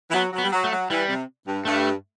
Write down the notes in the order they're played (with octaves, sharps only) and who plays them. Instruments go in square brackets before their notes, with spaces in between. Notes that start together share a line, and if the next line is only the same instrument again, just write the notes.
[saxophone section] E3
[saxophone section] F#3 [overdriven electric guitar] B3
[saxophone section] F#3
[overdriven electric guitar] B3
[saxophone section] G3
F#3
[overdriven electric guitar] A3
[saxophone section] F#3
[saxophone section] E3 [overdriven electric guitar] G3
[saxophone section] C3
G2
[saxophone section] G2 [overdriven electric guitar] A3